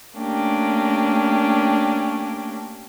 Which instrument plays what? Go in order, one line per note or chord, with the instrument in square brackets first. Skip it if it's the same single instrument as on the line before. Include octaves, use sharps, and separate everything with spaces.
[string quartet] A3 A#3 C#4 D4 G4